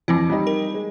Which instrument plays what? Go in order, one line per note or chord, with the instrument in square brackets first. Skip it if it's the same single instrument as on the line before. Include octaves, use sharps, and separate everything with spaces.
[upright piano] F2 [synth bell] E3 C4 E4
[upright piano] G3 D#4
[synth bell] A#4
[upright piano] G#3